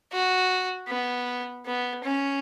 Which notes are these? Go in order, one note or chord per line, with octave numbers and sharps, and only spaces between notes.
F#4
B3
B3
C#4